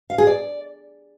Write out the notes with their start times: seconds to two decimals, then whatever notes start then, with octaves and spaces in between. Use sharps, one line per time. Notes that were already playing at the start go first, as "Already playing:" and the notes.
0.10 F5
0.18 G#4
0.27 D5